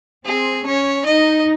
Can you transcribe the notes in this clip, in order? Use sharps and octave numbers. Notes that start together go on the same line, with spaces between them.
C4 G#4
C#4 C#5
D#4 D#5